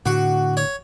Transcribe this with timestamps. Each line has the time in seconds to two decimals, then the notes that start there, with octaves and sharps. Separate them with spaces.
0.06 A2 D3 F#4
0.57 C#5